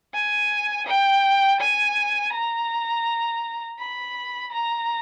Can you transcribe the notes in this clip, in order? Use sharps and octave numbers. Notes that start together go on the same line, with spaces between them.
G#5
G5
G#5
A#5
B5
A#5